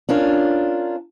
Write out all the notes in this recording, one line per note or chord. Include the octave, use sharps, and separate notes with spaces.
C#4 D4 F4 A#4